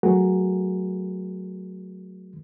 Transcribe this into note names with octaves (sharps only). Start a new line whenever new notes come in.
F#3 A3 F#4 G#4 A#4